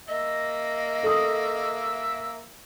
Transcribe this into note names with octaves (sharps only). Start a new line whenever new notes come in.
A#3 D#5 E5
A4 D#6